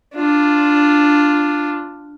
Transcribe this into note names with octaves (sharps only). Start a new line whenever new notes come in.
D4 F4